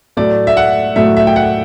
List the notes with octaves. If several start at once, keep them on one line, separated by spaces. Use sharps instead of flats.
A2 F#3 A3 D5
E5
F#5
A2 F#3 A3 E5
E5
G5
F#5